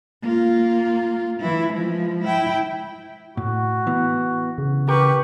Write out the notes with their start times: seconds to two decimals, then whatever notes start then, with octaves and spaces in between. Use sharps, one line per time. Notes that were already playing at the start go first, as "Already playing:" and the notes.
0.22 A#3 F4
1.41 E3 E4
1.73 F3 G#3
2.23 E4 G5
3.37 A2 F#4
3.87 E3 B3
4.58 C#3
4.89 G4 A#4 B4 C#6